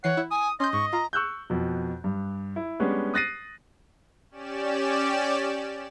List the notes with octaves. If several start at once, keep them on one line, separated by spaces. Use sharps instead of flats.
E3 C#5 F#5 C7
E4
G#5 D#6
C#4 D#5 C6 G6
G#2 C#6
F4 A#5
C#6 E6 F#6 G6
F2 B2
G2
E4
G3 G#3 B3 C#4 D4
D#6 F#6 A6 A#6 C7 D#7
C#4 G4 D5 E7